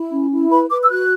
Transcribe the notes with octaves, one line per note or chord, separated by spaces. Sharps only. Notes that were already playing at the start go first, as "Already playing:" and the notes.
Already playing: E4
C#4
E4
B4 B5
B4 D6
E6
F#4 F#6